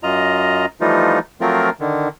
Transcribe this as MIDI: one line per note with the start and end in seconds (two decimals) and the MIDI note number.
0.03 0.66 42
0.03 0.66 65
0.03 0.66 75
0.03 0.66 82
0.81 1.19 52
0.81 1.19 53
0.81 1.19 55
0.81 1.19 57
0.81 1.19 63
0.81 1.19 65
1.41 1.70 53
1.41 1.70 54
1.41 1.70 57
1.41 1.70 60
1.41 1.70 65
1.41 1.70 70
1.80 2.08 50
1.80 2.08 51